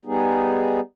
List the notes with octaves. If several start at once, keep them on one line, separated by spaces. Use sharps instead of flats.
G3 B3 D#4 G#4